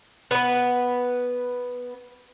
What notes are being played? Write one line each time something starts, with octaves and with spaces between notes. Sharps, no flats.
B3 B4